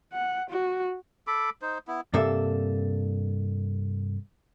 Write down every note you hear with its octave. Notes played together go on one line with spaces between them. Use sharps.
F#5
F#4
A4 B5 D6
D#4 C5
B3 E4
G2 C3 A#3 A4 E5